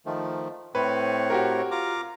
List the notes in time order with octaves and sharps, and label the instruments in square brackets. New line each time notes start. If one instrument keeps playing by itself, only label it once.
[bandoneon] D#3 F3 A3
[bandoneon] A2 C4 C#5 [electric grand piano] B4
[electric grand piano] F#4 G4 A#4
[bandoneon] F4 A#5 D6